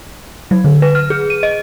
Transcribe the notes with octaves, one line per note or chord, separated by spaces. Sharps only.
F#3
D3
B4
F6
G#4
D#7
D#5